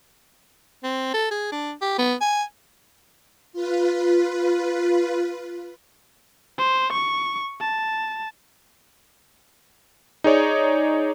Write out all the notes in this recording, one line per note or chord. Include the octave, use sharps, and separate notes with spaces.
C4
A4
G#4
D4
G4
B3
G#5
F4 B4
C5
C#6
A5
D#4 G#4 C#5 D5